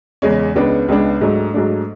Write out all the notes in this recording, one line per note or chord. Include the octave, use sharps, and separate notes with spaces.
E2 C#3 G#3 C#4
C#2 C#3 G#3 B3 D4
C#2 C#3 G#3 B3 D4
G#2 F#3 A3 D4
G#2 F#3 A3 D4